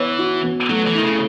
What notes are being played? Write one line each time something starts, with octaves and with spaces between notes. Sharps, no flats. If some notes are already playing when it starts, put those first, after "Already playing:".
Already playing: E3 B3 C#5
F#4
B3
F#3 A3
E3
D#3 E4
C#3